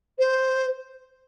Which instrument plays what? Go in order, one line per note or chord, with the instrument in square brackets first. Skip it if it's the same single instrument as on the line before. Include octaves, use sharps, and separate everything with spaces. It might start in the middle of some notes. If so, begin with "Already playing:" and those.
[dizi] C5